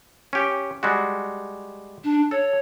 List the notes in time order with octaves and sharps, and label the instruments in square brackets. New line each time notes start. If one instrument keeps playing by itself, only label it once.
[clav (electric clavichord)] C#4 G4
G3 G#3 F#4
[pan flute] D4
[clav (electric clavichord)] A4 [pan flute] C#5